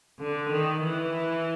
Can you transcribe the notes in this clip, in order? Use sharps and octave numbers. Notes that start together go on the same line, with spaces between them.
D3
D#3
E3